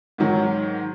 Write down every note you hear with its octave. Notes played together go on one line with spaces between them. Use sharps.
G#2 D#3 F#3